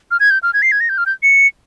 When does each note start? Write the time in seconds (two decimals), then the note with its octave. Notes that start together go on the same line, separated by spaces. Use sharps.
0.11 F6
0.20 G#6
0.30 G6
0.43 F6
0.53 G#6
0.62 C7
0.72 G#6
0.80 A#6
0.89 G6
0.98 F6
1.06 G6
1.23 C#7